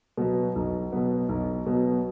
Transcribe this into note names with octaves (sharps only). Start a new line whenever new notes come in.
B2 F#3 B3
B1
B2 F#3 B3
B1
B2 F#3 B3